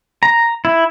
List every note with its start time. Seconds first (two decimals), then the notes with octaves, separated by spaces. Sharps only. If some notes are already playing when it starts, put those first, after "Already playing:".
0.23 A#5
0.65 E4